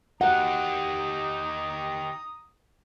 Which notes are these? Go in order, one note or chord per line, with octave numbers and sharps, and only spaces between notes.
D#4 G4 F#5 A#5 D#6